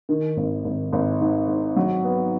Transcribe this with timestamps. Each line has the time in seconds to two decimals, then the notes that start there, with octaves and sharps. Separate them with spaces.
0.09 D#3
0.37 G#1
0.65 G#1
0.92 G#1
1.21 G#2
1.48 G#2
1.76 F#3
2.04 B3